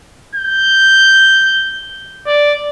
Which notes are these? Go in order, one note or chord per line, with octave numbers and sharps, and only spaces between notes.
G6
D5